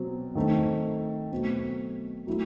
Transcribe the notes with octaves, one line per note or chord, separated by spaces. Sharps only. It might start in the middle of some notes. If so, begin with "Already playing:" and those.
Already playing: B2 F#3 C4
D#3 A3 C4
B2 F#3 A3 C4
F#3 A3 E4